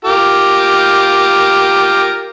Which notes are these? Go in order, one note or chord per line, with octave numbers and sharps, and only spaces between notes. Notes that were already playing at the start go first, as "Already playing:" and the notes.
F4 G4 A#4